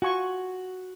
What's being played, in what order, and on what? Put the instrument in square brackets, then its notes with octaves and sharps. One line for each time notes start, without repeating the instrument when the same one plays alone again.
[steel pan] F4 G#5 C#6 [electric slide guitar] F#4